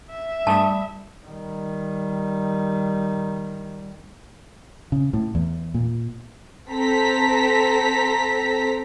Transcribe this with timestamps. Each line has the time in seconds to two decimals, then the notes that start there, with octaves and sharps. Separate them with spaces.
0.10 E5
0.47 G2 G3 A3 A5 D#6
1.27 D#3 G3
4.92 C#3
5.13 A2
5.35 E2
5.74 A#2
6.70 C4 A4 A#5 B6